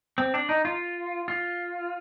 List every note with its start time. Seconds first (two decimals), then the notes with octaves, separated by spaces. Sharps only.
0.18 C4
0.34 D4
0.49 D#4
0.65 F4
1.28 F4